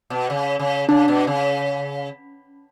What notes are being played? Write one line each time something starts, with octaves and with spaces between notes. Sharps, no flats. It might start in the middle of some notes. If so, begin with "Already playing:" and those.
B2
C#3
C#3
C#3 D4
B2
C#3